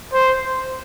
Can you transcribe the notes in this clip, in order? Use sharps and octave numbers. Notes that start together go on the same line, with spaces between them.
C5